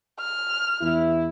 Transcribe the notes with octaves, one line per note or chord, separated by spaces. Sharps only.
F6
E2 E4